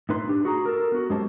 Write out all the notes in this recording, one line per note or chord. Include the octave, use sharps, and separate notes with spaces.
A2 D#4 B4 C6
D4 G4
F#4 G#4 A#5
A4 A#4
B3 F#4
F#2 G#3 C#4 G4 C5 A5